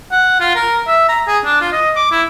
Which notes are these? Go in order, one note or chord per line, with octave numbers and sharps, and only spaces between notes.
F#5
F4
A#4
E5
A#5
G#4
D4
F4
D#5
D6
E4